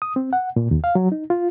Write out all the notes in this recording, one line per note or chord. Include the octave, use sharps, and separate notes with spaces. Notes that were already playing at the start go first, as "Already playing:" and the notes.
D#6
C4
F#5
A#2
D#2
F5
F#3
D#4
F4